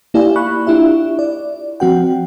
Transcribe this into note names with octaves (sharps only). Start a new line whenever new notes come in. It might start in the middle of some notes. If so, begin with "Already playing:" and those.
A#3 E4 G4 D5 F5 G#5
B5 C#6 F#6
D4 E4 F4 G4 E5
D5
F3 C4 F#4 F#5 G5